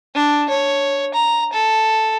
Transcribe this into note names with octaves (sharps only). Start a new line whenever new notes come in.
D4
C#5
A#5
A4